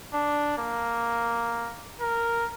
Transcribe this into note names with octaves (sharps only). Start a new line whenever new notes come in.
D4
A#3
A#4